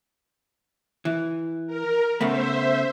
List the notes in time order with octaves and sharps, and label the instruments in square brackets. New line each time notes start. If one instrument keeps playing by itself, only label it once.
[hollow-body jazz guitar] E3
[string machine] A#4
[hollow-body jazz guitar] C#3 A3 B3 [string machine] C5 E5